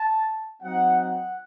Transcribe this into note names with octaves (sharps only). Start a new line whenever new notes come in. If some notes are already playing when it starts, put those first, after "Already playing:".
Already playing: A5
F#3 C4 D#4 F#5
F#5